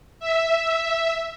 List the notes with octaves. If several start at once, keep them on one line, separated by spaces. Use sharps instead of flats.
E5